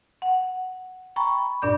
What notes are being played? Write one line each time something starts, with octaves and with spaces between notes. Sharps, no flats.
F#5
G5 A#5 B5 C#6
G2 A#2 D4 D5 G6